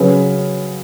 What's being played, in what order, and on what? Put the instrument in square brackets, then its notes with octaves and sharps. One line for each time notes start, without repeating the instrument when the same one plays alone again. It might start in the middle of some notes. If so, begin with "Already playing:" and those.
Already playing: [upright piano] C#3 F#3 C#4 G#4 B4